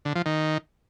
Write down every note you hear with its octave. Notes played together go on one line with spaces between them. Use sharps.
D3
F3
D#3